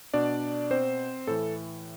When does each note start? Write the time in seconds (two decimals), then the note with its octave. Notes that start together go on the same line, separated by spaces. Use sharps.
0.14 B2 D4 D5
0.71 C4 C5
1.27 A2 E3 A4